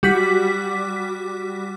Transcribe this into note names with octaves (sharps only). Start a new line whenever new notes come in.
G3 F#4 D6 B6